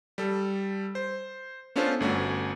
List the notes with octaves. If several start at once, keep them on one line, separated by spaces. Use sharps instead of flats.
G3 A4
C5
B3 C#4 D4 F4 A4 C5
G1 A3 C#4 F#4